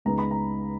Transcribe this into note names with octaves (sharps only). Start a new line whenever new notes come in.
C#2 C#3 G#3 B3 D#4 A#5
B5
A#5